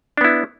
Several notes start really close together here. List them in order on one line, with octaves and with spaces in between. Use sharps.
D4 B3 E4